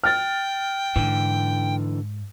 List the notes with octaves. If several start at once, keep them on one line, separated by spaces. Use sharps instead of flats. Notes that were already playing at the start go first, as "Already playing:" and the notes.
G5 F6 A6
G#2 D3 E3